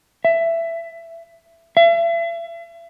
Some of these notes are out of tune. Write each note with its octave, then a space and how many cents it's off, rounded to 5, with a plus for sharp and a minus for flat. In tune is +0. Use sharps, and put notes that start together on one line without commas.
E5 +15
E5 +40